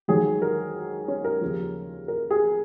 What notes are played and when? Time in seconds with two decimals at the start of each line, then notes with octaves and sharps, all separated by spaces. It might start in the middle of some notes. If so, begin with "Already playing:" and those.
0.08 G#2 D#3 F#3 G#4
0.42 A#4
1.08 C#4
1.25 A#4
1.41 D#2 C#3 F3
2.08 A#4
2.31 G#4